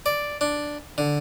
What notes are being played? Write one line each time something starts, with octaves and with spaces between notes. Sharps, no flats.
D5
D4
D3